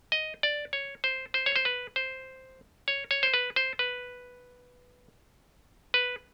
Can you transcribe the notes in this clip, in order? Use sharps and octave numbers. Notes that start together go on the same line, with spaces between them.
D#5
D5
C#5
C5
C5
C#5
C5
B4
C5
C#5
C#5
C5
B4
C5
B4
B4